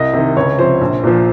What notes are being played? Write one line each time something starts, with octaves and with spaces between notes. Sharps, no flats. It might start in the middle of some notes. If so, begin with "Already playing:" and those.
Already playing: C2 D#5
C3 D#3
C#2 C#5
C3 F3 C5
A#1
A#2 F3